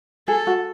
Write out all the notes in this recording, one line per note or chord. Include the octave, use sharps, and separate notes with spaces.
G#4 A4
F#4